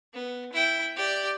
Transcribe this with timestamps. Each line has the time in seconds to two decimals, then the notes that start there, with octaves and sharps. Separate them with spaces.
0.14 B3
0.52 E4 G5
0.96 G4 D5